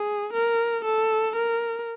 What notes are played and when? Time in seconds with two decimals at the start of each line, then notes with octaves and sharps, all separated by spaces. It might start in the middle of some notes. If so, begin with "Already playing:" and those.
Already playing: G#4
0.34 A#4
0.85 A4
1.36 A#4